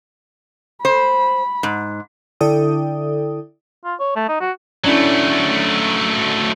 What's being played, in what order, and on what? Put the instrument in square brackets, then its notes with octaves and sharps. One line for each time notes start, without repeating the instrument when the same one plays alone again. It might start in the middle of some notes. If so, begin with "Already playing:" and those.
[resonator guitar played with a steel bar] C5 [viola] B5
[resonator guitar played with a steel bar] G#2
[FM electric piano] D3 E4 A4 D5 G5 D#6
[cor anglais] F4
C#5
A3
D#4
F#4
[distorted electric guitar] F#3 A3 [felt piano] C#4 D4 E4